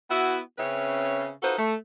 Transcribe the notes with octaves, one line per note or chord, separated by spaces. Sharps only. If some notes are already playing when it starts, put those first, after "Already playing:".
B3 E4 F#4
C#3 C4 C#4 B4 C#5 E5
D#4 F4 F#4 A4 B4 C5
A3